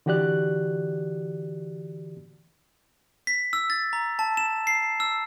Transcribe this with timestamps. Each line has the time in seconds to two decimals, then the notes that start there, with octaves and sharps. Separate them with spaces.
0.06 D3 E3 F#4 G4 D5 F#6
3.27 B6
3.53 E6
3.70 A6
3.93 A#5
4.19 A5
4.37 E7
4.67 C7
5.00 E6